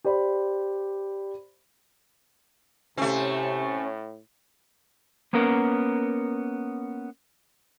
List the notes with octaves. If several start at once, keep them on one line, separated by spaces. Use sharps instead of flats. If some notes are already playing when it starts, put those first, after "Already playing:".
G4 C5 D5 B5
A2 C3 A3 C4 C#4
A#3 B3 C#4 A#4